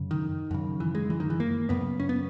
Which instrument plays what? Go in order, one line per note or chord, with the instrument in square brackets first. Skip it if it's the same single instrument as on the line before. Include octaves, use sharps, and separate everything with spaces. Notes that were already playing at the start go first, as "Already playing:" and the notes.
Already playing: [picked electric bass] F#2 C#3
D#3
F#2 C#3
E3
G#3
E3
D#3
E3
A#3
F#2 C#3 B3
C#4
B3